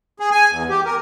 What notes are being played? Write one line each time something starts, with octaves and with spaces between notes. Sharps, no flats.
G#4
G#5
E2
G4
A#4